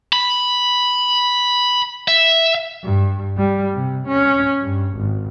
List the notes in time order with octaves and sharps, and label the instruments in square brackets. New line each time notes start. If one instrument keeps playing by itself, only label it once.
[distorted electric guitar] B5
E5
[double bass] G2
G3
C3
C#4
G2
G#1